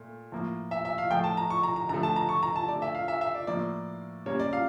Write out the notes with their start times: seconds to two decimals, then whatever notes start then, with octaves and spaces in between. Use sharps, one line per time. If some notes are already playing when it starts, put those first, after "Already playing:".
Already playing: A#2 A3
0.32 A2 F3 A#3
0.71 E5
0.85 E5
0.98 F5
1.10 A2 F3 A3 G5
1.24 A5
1.37 A#5
1.50 C#6
1.63 A#5
1.76 A#5
1.89 D3 A#5
1.92 F3 A3
2.03 A5
2.16 A#5
2.29 C#6
2.43 A#5
2.56 A5
2.68 D3 A3 D5
2.82 E5
2.95 F5
3.08 E5
3.21 E5
3.34 D5
3.47 A2 F3 A#3 D5
4.26 C#3 G3 A#3 C#5
4.40 D5
4.53 F5